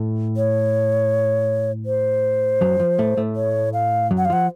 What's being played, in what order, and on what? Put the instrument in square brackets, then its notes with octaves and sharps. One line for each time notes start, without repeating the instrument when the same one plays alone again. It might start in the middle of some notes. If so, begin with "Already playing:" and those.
Already playing: [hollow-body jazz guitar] A2 A3
[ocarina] C#5
C5
[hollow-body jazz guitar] F#2 F#3
F3
A2 A3
A2 A3
[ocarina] C#5
F5
[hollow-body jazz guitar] F#2 F#3
[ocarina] F#5
F5
[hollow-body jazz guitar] F3 [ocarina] F#5